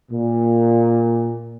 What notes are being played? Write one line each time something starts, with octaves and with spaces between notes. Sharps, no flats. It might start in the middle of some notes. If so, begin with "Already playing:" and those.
A#2